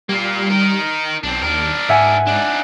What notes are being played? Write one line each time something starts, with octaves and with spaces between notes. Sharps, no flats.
G3 A#3 F4
D#4 A#4
B1 C4 D4
D#2 D4 A#4
G#2 E5 F#5 G#5
D4 D#4